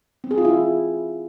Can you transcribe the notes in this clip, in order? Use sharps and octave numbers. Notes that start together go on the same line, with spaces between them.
C4
G#4
F4
E4